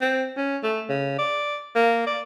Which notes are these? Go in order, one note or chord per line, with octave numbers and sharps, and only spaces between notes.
C4
C#4
A3
C#3
D5
A#3
D5